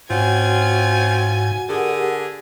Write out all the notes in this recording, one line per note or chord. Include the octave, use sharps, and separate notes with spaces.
G#2 C4 C#4 F4 F#4 F#5 G#5
D3 G4 G#4 A#4 F#5